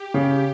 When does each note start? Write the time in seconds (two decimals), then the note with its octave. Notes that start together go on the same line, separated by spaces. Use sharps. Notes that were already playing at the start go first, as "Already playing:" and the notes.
Already playing: G4
0.14 C#3